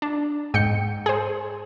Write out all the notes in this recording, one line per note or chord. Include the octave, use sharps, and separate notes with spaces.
D4
G#2 G5 G6 C#7
G#4 C5